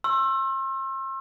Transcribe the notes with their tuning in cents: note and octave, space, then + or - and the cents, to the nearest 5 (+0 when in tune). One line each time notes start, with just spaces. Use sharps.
C6 +40 E6 +20